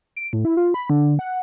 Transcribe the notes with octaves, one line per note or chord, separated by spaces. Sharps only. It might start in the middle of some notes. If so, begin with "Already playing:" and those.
D7
A2
E4
F4
B5
D3
F#5